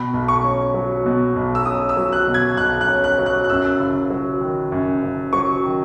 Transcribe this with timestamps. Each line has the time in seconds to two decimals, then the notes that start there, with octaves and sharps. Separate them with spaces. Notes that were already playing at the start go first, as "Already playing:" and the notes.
Already playing: B2 B5
0.14 B1
0.28 C#6
0.44 C#4
0.74 F#3
1.06 B2
1.36 B1
1.55 E6
1.65 C#4 D#6
1.89 E6
1.97 F#3
2.12 F#6
2.27 B2
2.34 G#6
2.57 B1 F#6
2.81 F#6
2.88 C#4
3.04 F#6
3.18 F#3
3.26 F#6
3.44 F#6
3.50 F#2 E6
3.80 F#1
4.10 F#3
4.41 D#3
4.72 F#2
5.02 F#1
5.33 F#3 C#6
5.63 D#3